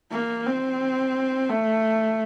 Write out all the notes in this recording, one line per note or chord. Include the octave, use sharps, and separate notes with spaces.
A#3
C4
A3